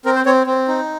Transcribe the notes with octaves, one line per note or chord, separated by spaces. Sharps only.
C4 A#4
C5
C4 C#5
C4
D#4